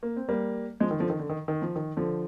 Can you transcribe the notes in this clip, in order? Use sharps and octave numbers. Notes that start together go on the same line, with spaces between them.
A#3
C4
G3 A#3
F3 G#3
D#3
D3 F3
D#3
D3
D#3
D#3
F3
D#3
D3 F3